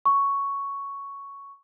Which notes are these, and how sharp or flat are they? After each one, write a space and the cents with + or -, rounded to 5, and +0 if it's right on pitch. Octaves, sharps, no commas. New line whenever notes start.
C#6 +5